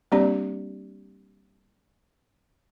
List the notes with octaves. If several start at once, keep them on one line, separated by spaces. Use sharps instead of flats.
G3 A#3 C4 D4 G4 D5